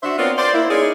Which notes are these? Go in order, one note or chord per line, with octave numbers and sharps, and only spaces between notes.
D4 F#4 C5 E5
B3 C4 F4 A#4 C#5 D5
C5 D5
A#3 E4
C#4 D#4 G#4 A#4 C#5 D5